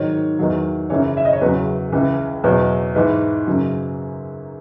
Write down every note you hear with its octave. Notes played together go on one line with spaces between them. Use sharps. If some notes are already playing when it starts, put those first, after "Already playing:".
Already playing: G#2 D#3 F#3 C#5
E2 D#3 F#3
F#2 C#3 E3 C#5
E5
D#5
C#5
E2 C#3 F#3 B4
C#2 C#3 E3
E2 B2 F#3 C#5
G#2 E3 B4
F#2 C#3 F#3